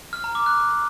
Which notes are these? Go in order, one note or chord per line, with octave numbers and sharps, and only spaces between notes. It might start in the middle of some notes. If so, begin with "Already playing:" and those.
F6
A#5
D6
F#6